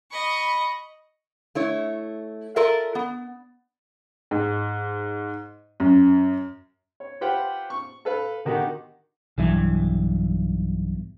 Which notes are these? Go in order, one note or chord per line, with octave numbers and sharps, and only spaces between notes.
D#5 B5 C#6
A3 E4 C#5
F4 A4 A#4 D5 E5
B3
G#2
F#2
C#5
F4 G4 B4 C5 F#5 G5
C#6
A4 B4 F5
D3 D#3 D#4 F#4 G4
B1 G2 E3